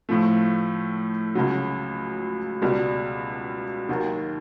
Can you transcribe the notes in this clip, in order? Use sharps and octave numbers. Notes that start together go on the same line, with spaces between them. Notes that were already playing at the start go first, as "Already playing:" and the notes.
A2 F3 A3
C#2 C#3 F#3
C#2 B2 G3
D#2 D#3 F#3